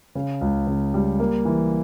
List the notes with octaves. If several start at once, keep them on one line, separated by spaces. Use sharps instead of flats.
C#3
C#2
C#3
G3
A#3
E3